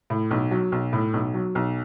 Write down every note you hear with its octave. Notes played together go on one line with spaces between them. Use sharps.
A2
B1
F#3
B1
A2
B1
F#3
B1